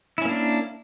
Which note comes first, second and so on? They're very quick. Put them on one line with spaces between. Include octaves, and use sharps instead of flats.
E4 C#4 A#3 D4